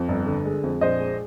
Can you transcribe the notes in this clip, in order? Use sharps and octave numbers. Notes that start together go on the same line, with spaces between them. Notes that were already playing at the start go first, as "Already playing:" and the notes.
Already playing: F2
G1
D3
G#3
F2
A#1 C5 D#5
G#3